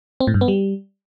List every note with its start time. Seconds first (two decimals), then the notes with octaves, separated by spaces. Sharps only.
0.20 C4
0.27 A2
0.34 G2
0.41 B3
0.48 G3